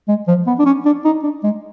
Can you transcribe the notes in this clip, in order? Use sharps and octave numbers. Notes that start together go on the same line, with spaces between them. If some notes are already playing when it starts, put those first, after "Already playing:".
G#3
F3
B3
D4
C#4
D4
D#4
D4
G#3